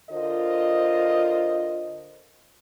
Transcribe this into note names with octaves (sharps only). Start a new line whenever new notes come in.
D3 F4 A#4 C5 D#5